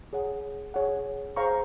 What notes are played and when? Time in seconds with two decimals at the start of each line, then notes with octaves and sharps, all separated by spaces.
0.13 G#4 C#5 F#5
0.74 G#4 C#5 F#5
1.36 G#4 C5 F5 A#5 C#6